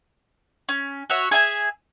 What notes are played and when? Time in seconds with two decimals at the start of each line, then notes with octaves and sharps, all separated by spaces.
0.69 C#4
1.10 F#4 C#5 E5
1.31 G#4 E5 G#5